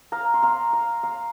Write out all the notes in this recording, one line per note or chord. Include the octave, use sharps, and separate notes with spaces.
F5 A#5
C6
F5 A#5
F5 A#5
F5 A#5